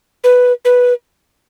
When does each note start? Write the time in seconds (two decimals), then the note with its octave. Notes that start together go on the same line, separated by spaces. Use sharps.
0.24 B4
0.65 B4